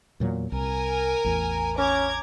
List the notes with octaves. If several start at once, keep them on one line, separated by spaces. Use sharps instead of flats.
E2 A#2 F#3
C2 A#4 G#5
A1 E2
C#4 A#5 D6 G#6